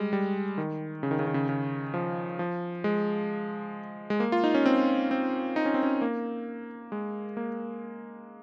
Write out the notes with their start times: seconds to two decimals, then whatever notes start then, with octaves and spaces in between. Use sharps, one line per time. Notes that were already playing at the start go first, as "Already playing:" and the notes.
Already playing: G3 G#3
0.13 G3
0.58 D#3
1.03 C#3
1.11 D#3
1.19 C#3
1.27 D#3
1.34 C#3
1.49 C#3
1.94 F3
2.39 F3
2.84 G#3
4.10 G#3
4.20 A#3
4.32 F4
4.44 D#4
4.54 C#4
4.66 C4
5.11 C4
5.56 D#4
5.65 C#4
5.74 C4
5.83 C#4
6.01 A#3
6.92 G#3
7.37 A#3